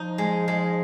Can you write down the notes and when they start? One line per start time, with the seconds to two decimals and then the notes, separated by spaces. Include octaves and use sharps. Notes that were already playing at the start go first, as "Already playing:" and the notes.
Already playing: F3 D#4
0.18 G#3
0.48 G#3